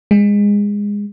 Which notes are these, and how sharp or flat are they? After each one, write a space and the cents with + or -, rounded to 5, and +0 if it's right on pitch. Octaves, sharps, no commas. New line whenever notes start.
G#3 -20